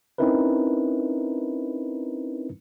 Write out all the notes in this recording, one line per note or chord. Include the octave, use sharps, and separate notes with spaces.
C4 C#4 D#4 E4 A#4 B4